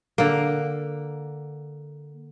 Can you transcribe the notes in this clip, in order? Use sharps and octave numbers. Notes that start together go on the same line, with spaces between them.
D3 A#3